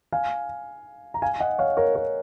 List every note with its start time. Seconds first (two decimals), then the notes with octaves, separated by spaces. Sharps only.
0.12 F5 G#5
1.14 A#5
1.22 F5 G#5
1.40 D#5 F#5
1.59 C#5 F5
1.77 A#4 C#5
1.95 A#4 C#5